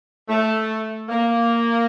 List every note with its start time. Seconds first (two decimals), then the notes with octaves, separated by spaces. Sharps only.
0.29 A3
1.09 A#3